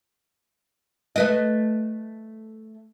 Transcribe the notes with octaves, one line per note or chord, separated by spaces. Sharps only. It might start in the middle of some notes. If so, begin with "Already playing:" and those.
A3 B4 D#5